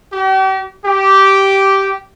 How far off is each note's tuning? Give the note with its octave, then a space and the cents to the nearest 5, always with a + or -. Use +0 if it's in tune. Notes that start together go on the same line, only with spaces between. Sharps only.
G4 -40
G4 -10